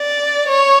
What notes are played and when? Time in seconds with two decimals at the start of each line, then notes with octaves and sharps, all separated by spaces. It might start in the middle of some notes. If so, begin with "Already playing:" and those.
Already playing: D5
0.49 C#5